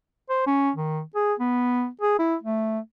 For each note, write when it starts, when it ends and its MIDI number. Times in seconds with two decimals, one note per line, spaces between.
0.29 0.44 72
0.47 0.71 61
0.76 1.01 51
1.15 1.33 68
1.40 1.87 59
2.01 2.17 68
2.19 2.35 64
2.43 2.79 57